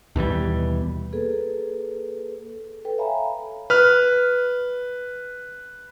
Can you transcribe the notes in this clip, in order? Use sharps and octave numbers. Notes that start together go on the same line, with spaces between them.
D#2 B2 E3 G3
A#3 G#4 A4 B4
A4 B4 G5
C#5 E5 F5 G#5 A#5 B5
B4 F6